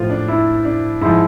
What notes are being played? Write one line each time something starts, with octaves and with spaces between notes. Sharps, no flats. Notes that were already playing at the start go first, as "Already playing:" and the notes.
Already playing: A2 F3 F4 C5
D4
E4
D4
G#2 F3 E4